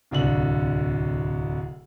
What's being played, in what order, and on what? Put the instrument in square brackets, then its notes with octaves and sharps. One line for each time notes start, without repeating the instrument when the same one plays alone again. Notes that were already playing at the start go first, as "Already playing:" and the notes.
[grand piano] D1 C2 D3 F#7